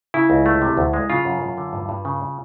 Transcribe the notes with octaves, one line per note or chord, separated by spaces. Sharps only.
C#3 E4
C#2
A3
C3
D2
G#3
C#3 F4
F#2
F#2
D3
G2
G2
C#3